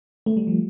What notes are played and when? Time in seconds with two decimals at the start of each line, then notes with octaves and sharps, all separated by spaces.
0.26 A3
0.37 G3
0.47 F3